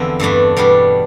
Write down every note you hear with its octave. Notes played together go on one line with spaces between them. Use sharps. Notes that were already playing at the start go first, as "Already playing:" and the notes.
Already playing: E2 D3 F3 C4 E4
G2 E3 A3 D4
E2 B2 G3 D4